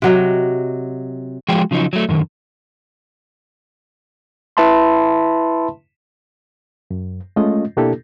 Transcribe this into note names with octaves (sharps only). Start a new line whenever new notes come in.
C3 F#3 D#5
F3 G#3 F#4 G#4 G5
C#3 F3 F#3 D#4
F#3 A3
F#2 D3 D#3
E4 B4 E5 A5 B5 C6
F#2
G#3 A3 C#4 F4 D#5
B2 A#3 D4 E4 G4 A4